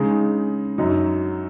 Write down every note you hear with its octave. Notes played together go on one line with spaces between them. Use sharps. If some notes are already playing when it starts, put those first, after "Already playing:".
Already playing: C#3 G#3 D#4
F#2 F#3 D#4